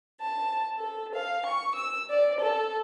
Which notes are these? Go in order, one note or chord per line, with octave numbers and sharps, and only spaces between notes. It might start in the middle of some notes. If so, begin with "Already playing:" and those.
A5
A4
F5
C#6
E6
D5
A4